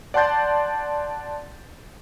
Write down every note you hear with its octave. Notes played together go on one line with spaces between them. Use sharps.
D5 F#5 A5 C6 G6 A6